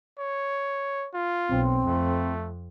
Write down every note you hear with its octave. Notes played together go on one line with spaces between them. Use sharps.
C#5
F4
B1 C4
F2 A3